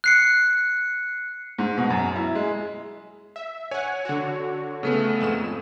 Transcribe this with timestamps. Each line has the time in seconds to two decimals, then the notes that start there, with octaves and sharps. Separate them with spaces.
0.04 F#6 C7 C#7
1.58 G#2
1.78 B2
1.90 F#2
2.16 E4
2.35 G#3
3.36 E5
3.71 C#5 F#5 G#5
4.05 D3 F#4
4.83 C#3 A3 B3
5.20 F2 G#2 E7